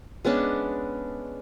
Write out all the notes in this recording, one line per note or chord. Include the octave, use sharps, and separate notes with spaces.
G#3 B3 C#4 D4